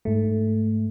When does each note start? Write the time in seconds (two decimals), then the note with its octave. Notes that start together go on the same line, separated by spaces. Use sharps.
0.05 G#2 A3